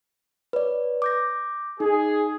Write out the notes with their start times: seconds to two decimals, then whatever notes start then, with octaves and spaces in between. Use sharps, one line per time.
0.53 B4 C#5 D5
1.02 D6 G6 A#6
1.80 D#4 G#4